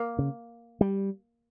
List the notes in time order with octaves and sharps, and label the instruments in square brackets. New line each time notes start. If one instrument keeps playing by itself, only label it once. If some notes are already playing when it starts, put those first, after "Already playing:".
Already playing: [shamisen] A#3
[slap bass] C#3
G3